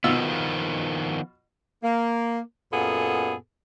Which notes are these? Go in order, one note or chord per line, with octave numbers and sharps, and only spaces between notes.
B2 D#3 F3 B3 F4 E6
A#3
F#2 A#2 B3 G#4 A4